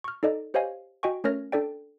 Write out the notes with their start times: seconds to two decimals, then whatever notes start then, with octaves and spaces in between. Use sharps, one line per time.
0.04 C#6 F6
0.23 D#4 A4 D5 D#5
0.54 G4 C5 C#5 D#5 F5 G#5
1.03 F#4 D#5 G5 G#5 C#6
1.24 A3 C#4 A#4 C#5 F6 A#6
1.52 D4 A4 D5 G5